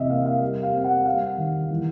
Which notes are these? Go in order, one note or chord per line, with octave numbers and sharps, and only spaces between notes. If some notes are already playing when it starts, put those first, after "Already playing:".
Already playing: C3 E3 D#5 E5
A#3 F5
F5
G3
F5
C4
F#5
G3 F5
D#3
E3